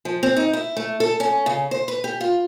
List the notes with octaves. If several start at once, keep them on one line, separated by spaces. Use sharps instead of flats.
F3
C4
D#4
E4
A3
A4
C#4
C#3
C5
B4
G4
F4